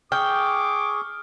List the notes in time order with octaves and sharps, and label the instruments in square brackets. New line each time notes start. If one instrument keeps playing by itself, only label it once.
[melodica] G#4 C#6 [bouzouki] G5 [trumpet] D6 [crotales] F6